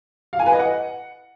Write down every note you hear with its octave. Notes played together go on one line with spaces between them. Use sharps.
F5
G#5
B4
D#5
F#5